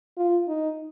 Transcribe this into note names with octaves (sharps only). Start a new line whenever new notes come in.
F4
D#4